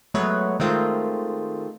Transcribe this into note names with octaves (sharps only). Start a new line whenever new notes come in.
F#3 G#3 A3 B3 B4 C#5
D#3 G#3 A3 C4 F4